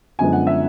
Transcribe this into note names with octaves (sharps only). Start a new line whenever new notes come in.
F#2 D3 F3 G#3 B3 G#5
F#5
E5